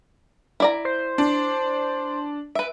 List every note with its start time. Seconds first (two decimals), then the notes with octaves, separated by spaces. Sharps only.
0.60 E4 D5 A#5
0.85 C5
1.18 D4
2.55 B4 E5 D7